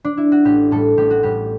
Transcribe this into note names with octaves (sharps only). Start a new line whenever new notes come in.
D4
E4
F#4
A1 G4
A2 G3 A4
A1 G4
F#4
A2 G3 G4